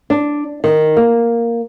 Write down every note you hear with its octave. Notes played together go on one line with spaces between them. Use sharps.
D4
D#3
A#3